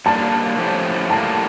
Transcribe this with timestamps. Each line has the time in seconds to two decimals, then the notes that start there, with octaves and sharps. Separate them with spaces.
0.06 A#2 G3 A#3 D4 A5
0.58 A2 F3 A3 C#4 G4
1.10 A2 G3 A#3 A5